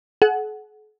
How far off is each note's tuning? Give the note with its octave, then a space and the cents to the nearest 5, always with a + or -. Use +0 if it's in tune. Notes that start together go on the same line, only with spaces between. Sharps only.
G#4 +45 F#5 +0